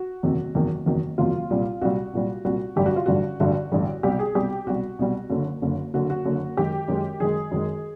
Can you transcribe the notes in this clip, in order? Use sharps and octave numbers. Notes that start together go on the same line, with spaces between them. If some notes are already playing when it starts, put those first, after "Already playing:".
Already playing: F#4
F#1 E2 C3 D#3 F#3
F#1 E2 C3 D#3 F#3
F#1 E2 C3 D#3 F#3
F#1 E2 C3 D#3 F#3 F4
C2 A#2 G3
C2 A#2 G3 F#4
C2 A#2 G3
C2 A#2 G3 F#4
A1 G2 D3 G3 G4
F#4
F4
A1 G2 D3 G3 F#4
A1 G2 D3 G3 F#4
A1 G2 D3 G3
C2 B2 G3 G4
G#4
C2 B2 G3 G4
C2 B2 G3 F#4
C2 B2 G3
F#1 F#2 D3
F#1 F#2 D3
F#1 F#2 D3 F#4
F#4
F#1 F#2 D3
F#2 D#3 G#3 G4
F#2 D#3 G#3
F#2 D#3 G#3 G#4
F#2 D#3 G#3